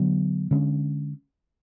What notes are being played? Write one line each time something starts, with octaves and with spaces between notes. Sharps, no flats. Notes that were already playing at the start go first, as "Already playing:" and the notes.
Already playing: D3 F#3 B3
D3 G#3 C#4